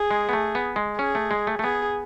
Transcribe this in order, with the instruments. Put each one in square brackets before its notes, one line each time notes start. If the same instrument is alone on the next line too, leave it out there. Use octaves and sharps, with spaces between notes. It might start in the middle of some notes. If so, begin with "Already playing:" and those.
Already playing: [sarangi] G#4
[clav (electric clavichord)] G#3
B3
A3
B3
G#3
[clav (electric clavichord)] C#4 [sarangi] G#4
[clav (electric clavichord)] A3
G#3
A3
A3
[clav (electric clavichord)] B3 [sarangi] G#4